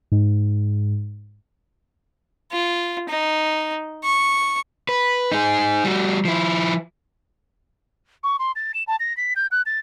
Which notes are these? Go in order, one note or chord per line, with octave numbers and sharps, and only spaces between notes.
G#2
F4
D#4
C#6
B4
D#4 G#4
G3 F#4
F3 E4
C#6
C6
A6
E7
A5
A#6
B6
G6
F#6
A6